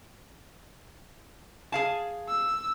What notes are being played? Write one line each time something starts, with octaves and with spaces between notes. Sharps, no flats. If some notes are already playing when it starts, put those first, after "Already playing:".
G#4 F5 A5
E6